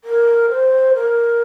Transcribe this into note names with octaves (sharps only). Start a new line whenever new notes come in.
A#4
C5
A#4